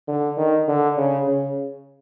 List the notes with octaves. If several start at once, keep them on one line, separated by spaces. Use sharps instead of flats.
D3
D#3
D3
C#3
C#3